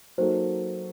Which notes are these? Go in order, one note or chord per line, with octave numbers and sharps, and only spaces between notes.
F#3 A#3 D#4 F#4 A4 C5